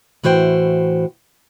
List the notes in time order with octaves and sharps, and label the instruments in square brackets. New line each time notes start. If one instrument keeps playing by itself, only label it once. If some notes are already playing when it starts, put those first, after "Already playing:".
[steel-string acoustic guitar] A2 E3 F#4 C5 G5